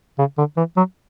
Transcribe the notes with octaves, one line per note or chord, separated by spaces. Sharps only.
C#3
D3
E3
F#3